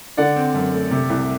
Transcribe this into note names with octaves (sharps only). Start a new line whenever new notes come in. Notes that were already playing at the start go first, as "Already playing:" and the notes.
D3 D5 F#5
C4
F#2
A3
C3
C2